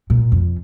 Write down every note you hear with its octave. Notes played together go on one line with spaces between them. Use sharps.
A#2
F2